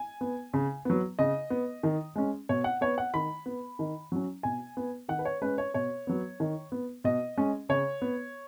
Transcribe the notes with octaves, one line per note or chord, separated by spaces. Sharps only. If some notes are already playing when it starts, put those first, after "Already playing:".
Already playing: G#5
B3
C#3
F#3 B3
C#3 D#5
B3
D#3
G#3 C#4
B2 C#5
F#5
B3 C#5
F#5
D#3 B5
B3
D#3
F#3 C#4
B2 G#5
B3
D#3 F#5
B4
C#5
G#3 C#4 B4
C#5
B2 C#5
F#3 B3
D#3
B3
B2 D#5
G#3 C#4
C#3 C#5
B3